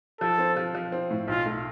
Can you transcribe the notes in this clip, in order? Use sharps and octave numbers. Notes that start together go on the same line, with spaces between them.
F3 A4
C4
F3
F3
C4
A2
B1 F4
A3